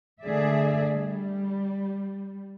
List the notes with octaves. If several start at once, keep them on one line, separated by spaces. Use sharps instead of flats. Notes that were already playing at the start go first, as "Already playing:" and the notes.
D3 A3 G#4 D5 E5
G3